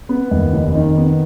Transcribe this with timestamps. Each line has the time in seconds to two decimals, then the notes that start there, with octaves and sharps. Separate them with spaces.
0.09 B3
0.31 D#2
0.53 F1
0.75 D#3
0.97 B3